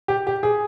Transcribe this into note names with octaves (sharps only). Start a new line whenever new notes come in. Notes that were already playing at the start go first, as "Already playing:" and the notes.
G4
G4
G#4